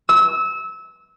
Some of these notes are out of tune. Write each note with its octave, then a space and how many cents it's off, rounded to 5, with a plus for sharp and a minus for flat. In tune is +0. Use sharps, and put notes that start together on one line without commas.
E6 -25